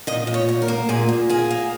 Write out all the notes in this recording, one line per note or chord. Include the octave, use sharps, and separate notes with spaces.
A#2 D#5
A#2
C#5
A#2
A#4
A#3
A#2 G#4
A#2
A#3 G#4
A#3